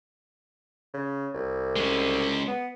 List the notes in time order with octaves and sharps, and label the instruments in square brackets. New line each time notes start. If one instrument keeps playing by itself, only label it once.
[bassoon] C#3
C2
[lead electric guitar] G#3 C#4
[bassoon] B3